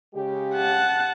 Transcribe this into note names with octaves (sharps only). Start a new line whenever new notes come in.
C#3 G#3 G4
F#5 A5